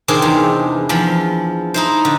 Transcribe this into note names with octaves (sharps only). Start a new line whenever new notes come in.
C3 D#3 C4 D4 G#4
E2
E2 F3 B5
D#4 E4 C5
D3